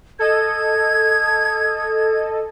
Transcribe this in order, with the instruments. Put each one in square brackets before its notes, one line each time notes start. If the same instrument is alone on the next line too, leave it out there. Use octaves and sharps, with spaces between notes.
[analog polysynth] A4 D#5 [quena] G#6